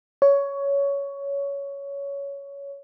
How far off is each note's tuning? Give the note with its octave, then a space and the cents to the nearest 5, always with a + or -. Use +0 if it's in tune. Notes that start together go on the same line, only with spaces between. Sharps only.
C#5 +15